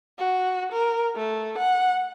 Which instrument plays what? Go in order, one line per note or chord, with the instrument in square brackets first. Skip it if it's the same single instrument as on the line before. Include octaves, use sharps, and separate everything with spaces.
[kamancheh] F#4
A#4
A3
F#5